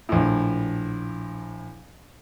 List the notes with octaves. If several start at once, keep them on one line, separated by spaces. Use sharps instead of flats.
A#1 A2